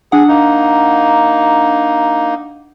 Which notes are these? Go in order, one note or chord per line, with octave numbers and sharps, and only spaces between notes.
D4 G#4 F#5
A#3 D#4